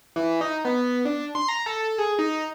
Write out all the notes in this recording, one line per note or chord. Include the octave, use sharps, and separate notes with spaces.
E3
D#4
B3
D4
C6
A#5
A4
G#4
D#4